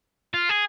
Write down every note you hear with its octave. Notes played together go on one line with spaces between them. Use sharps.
F4
G#4